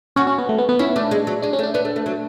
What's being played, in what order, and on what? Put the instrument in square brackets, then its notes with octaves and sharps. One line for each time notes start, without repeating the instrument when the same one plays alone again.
[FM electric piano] C#4 [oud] F#4
[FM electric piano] C#4
B3
A3
B3
B3
[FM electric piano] C#4 [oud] E4
[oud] A3 [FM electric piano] D4
[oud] G#3
F#3
[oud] G#3 [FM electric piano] D4
[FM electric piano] C#4
[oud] A3
[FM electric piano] D4
[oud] B3 [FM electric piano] D4
[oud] A3
A3
F#3